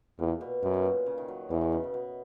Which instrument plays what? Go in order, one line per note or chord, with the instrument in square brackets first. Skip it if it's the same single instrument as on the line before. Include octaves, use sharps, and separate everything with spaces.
[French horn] E2 [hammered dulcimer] A#2
[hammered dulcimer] B2
[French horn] F#2 [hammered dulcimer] C#3
[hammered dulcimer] B2
A#2
C#3
D#3
F#3
[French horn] E2 [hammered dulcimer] E3
[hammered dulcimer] D#3
C#3
B2
B2